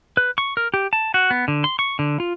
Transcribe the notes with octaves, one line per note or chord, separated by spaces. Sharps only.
B4
C#6
A#4
G4
A5
F#4
B3
D3
C6
C#6
D3
F4